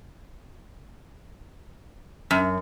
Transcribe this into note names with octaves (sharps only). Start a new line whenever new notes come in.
F#2